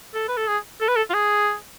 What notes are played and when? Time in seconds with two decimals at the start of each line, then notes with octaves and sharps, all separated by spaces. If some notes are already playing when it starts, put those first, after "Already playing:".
0.14 A4
0.28 B4
0.37 A4
0.47 G#4
0.81 A4
0.88 B4
0.96 A4
1.10 F4
1.14 G#4